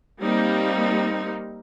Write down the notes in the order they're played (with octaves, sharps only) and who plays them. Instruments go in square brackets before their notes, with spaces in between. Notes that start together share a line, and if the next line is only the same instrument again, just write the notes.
[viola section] G3 A#3 C4 D#4